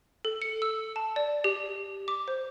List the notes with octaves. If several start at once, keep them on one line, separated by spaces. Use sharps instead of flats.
A4
C#7
E6
A5
D5
G4
D6
C5